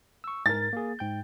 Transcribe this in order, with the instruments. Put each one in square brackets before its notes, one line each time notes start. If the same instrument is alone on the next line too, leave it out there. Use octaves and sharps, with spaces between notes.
[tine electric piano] C#6 E6
[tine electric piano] G#2 A#4 [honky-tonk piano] A6
[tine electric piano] A#3 G#4
G#2 G5 G6